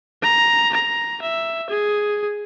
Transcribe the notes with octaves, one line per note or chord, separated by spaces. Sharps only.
A#5
A#5
E5
G#4